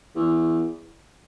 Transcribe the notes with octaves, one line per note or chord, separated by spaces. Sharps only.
E2